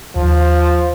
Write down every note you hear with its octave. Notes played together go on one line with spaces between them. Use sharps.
D#2 F3